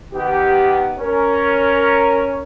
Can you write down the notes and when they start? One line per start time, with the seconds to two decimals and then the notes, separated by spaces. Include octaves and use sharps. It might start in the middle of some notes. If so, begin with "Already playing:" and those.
0.14 D#3 B3 G4
0.99 C#4 A#4